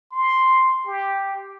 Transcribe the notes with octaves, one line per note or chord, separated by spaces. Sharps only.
C6
G4